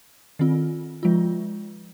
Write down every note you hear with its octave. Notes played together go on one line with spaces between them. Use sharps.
D#3 C4 F4
F3 G#3 F4